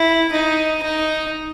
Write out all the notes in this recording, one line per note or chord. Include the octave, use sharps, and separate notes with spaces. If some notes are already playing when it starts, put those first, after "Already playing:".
Already playing: E4
D#4
D#4